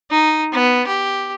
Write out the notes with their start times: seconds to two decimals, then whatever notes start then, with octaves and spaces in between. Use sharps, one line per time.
0.11 D#4
0.53 B3
0.87 G4